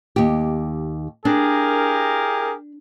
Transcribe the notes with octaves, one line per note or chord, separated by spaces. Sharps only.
D#2 G4
D4 E4 G4 G#4 A#4